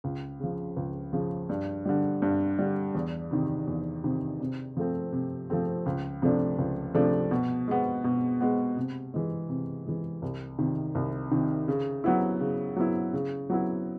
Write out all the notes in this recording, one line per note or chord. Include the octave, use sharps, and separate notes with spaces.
C#2
C#3 F3
C#2
C#3 F3
G2
D3 G3
G2
D3 G3
E2
C3 D#3
E2
C3 D#3
C3
F3 A3 C4
C3
F3 A3 C4
C#2
C3 F3 A3 D4
C#2
C3 F3 A3 D4
B2
G#3 B3
B2
G#3 B3
C3
E3 G#3
C3
E3 G#3
C2
C3 D#3
C2
C3 D#3
C#3
F#3 B3 E4
C#3
F#3 B3 E4
C#3
F#3 B3 E4